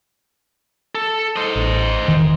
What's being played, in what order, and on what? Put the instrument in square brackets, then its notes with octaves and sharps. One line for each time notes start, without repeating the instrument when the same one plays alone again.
[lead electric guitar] A4
C5 D#5
[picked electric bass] A1
E1 D#3 E3